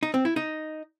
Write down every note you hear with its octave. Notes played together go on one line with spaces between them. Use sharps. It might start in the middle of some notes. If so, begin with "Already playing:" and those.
D#4
C4
E4
D#4